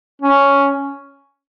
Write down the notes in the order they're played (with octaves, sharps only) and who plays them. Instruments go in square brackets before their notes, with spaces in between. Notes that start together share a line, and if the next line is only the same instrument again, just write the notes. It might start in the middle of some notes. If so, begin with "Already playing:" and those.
[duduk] C#4